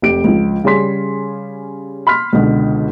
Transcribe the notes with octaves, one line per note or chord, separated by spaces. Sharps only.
F1 G4 D7
C#2 F3
C#3 G3 C#4 G#4 C6 B6
B5 C6 F6 B6
C#2 B2 D3